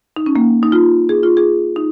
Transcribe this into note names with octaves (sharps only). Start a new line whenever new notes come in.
D#4
C#4
A#3
D#4
F4
G#4
F4
G#4
D#4